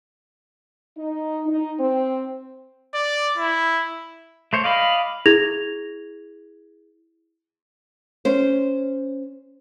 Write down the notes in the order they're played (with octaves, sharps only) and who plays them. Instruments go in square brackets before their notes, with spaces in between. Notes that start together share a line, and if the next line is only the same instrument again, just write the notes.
[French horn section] D#4
D#4
C4
[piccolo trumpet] D5
E4
[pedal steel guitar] A3 C5 C#5
[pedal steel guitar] D5 D#5 B5 [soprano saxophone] F5
[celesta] E4 G#4 G#6 A#6 F7
[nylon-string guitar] C#4 C5